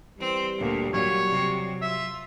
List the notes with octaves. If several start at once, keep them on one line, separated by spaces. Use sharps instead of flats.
E3 G3 C4
D2 A#2
A#2 F#3 C#5
C3
F4 E5